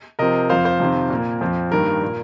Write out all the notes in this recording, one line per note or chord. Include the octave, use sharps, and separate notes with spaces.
C3 F3 C4 A#4 D#5
F2 F3 C4 C5 F5
C5 F5
F2 C3 D#3 C4
A#2 A#3
F2 F3 C4
G2 D#3 A#3 A#4
A#2 A#3